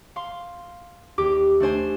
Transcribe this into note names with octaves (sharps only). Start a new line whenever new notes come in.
F5 C6
D#2 G4 D6
A3 D4 C5 G#5